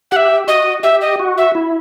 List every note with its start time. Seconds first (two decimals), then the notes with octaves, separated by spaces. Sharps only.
0.11 G4 E5 F#5
0.47 F#4 D#5
0.83 G4 E5
1.01 D#5
1.20 F#4
1.38 E5
1.55 E4